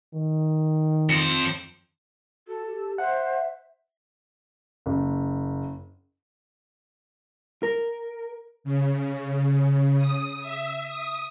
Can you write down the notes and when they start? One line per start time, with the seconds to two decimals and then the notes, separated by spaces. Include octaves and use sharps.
0.14 D#3
1.09 F2 C5
2.48 F#4 A4
2.66 G4
2.98 C5 E5 F#5
4.86 F#1
7.63 A#4
8.64 C#3
9.97 D#6
10.41 E5
10.86 D#6